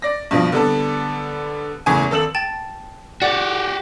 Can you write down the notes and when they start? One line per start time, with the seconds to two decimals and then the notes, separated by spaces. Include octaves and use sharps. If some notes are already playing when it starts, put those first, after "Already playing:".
0.02 D5 A#6
0.31 G2 B2 F3
0.52 D3 G3 B3 A4
1.86 F#1 E2 A2 G#5
2.11 G#1 A4 E6 E7 F#7
2.35 G5 A5 A6
3.22 F#4 G4 D5 F#5